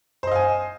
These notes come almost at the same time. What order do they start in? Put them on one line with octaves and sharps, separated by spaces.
C5 D#5 F5 G#5